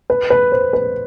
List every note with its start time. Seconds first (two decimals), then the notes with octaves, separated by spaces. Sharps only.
0.10 B4
0.30 B4
0.52 C5
0.73 B4